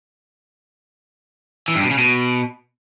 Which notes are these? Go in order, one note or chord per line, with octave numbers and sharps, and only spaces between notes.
E3
G2
B2
C#3
B2